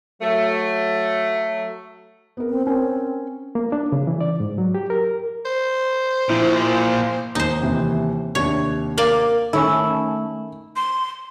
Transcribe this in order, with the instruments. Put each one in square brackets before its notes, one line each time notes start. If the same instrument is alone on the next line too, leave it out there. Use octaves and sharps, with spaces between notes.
[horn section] F#3 A3
[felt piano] B3 A#4
[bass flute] C4
[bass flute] C4 [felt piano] C#4 A#4
[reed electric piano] A#3
D4
C#3
E3
D5
G#2
F#3
G4
A#4
[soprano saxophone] C5
[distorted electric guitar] A#2 F3 [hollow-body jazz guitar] E4
[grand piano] D#2 [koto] D#4 C5
[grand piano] D#2 C3 E3
[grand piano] D#2 C3 D4 [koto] C#5
[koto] A#3 D5
[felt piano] D#3 [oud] A3 C#4 [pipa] E4
[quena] C6